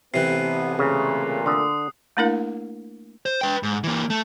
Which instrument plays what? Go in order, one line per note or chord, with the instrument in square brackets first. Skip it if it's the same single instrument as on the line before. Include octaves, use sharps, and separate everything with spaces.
[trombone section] A1 B3 [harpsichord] C3 E3 [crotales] F#6 C7
[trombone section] A#2 A3 [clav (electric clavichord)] C#3
[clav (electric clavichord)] D3 [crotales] D#6 C7
[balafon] A3 A#3 D4 E4 A#4 F5
[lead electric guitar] C5
B4 G5
G#2
E3 A#3
A3